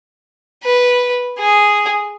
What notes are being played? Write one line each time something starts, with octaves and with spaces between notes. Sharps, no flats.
B4
G#4